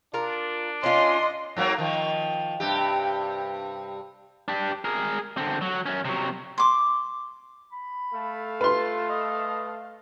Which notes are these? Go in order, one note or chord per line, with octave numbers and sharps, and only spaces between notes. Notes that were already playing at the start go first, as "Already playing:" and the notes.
D4 F4 A#4
C#4 D#4 F4 D#5 C6
G#2 F#3 A#3
D#3 F3
G2 C3 G4
D4 G4
G#4 A#4
D3 C4
F#3
F#2 C#4
C3 F#3
C6 D6
B5
A3 A4 F5
F4 B4 C6
D#5